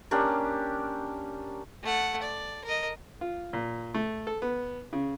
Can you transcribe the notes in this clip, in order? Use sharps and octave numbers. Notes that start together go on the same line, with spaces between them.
A#3 C#4 D4 G4
A3 F#5
D5
A#4 D#5
F4
A#2
A3
A4
B3
C#3